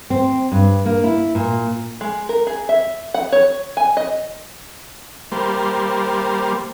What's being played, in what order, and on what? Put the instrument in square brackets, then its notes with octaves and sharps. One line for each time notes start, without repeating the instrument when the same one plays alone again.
[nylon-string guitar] C4
G2
A#3
E4
A#2
[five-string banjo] G#3
A#4
G#4
E5
F#5
C#5
G#5
D#5
[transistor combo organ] G3 A#3 C5